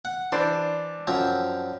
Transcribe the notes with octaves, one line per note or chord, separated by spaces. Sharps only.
F#5
E3 D4 C5 D5
F#2 F3 C4